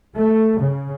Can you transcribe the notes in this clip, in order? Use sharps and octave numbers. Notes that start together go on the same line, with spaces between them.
A3
C#3